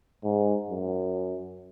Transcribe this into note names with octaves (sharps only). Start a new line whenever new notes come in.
G#2
F#2